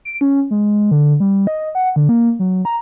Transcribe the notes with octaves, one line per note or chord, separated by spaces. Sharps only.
D7
C#4
G#3
D3
G3
D#5
F#5
D3
A#3
F#3
A#5